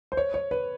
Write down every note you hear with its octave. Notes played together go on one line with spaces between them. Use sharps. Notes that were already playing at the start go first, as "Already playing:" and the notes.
C5
C#5
C#5
B4